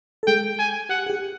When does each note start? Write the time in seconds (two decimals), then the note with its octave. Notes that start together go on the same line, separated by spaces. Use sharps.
0.23 A4
0.27 G#3 G#4 G5
0.59 G#5
0.89 G4 F#5
1.06 G#4
1.10 G4